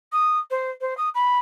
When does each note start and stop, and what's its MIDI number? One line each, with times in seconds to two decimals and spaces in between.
0.12 0.38 87
0.50 0.70 72
0.81 0.96 72
0.97 1.09 87
1.14 1.39 83